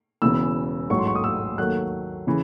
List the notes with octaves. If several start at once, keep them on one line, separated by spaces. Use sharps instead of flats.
E1 E2 C#3 E3 E6
A1 G#2 F#3 A3 C#6
C6
C#6
D#6
E6
D#2 D#3 F#3 A3 F#6
C#3 E3